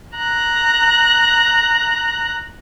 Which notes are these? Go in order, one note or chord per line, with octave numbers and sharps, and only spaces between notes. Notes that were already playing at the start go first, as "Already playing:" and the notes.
A#5 F#6